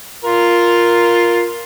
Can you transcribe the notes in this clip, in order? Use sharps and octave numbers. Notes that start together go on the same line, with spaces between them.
F4 A#4